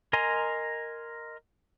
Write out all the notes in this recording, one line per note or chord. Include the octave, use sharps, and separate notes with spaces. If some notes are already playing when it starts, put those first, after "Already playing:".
A#4 D#5 G#5 A#5 C6